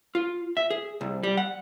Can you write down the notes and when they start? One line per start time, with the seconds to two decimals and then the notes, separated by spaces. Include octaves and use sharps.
0.15 F4
0.57 E5
0.70 G#4
1.01 C2
1.23 G3
1.37 F#5